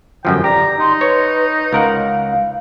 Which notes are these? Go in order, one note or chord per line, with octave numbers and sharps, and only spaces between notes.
G1 F#2 F3 G5
G4 D5 A#5
D#4 C6
B4 C#5
C#2 A#4 F5 F#5